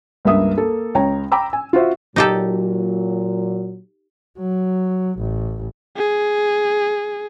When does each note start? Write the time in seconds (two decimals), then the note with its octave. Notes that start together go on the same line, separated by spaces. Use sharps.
0.25 C#2 G2 A#3 E5 D#6
0.58 A#3 A4
0.95 C#2 C#5 G5 A#5
1.32 G5 A#5 B5 D6 E6
1.53 G#5
1.73 F4 F#4 C5 E5
2.16 A#2 F#3 D#4 G4 A4
4.38 F#3
5.19 A1
5.97 G#4